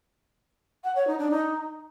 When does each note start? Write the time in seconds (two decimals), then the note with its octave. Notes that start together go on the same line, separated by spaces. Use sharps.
0.84 F#5
0.96 C#5
1.07 D#4
1.19 D4
1.31 D#4